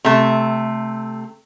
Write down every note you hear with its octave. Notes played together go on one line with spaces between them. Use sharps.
C3 A3